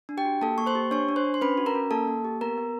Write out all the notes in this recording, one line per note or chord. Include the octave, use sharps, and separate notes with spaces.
D4
G4 G5
F#4
A#3 A4 A5
A#3 C#6
C5 C6
G4
D4 C#5 C#6
D4
C5 C6
D4
C6
C#4 B4 B5
F#4
A#4 A#5
C#4
A#3 A4 A5
A#3
G4
B3 A#4 A#5
B3